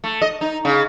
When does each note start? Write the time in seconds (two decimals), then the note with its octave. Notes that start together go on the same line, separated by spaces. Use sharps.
0.04 A3
0.22 D#5
0.41 D#4
0.65 C#3